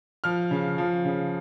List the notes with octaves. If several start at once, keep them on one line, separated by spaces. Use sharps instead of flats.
F3 F6
C#3
F3
C#3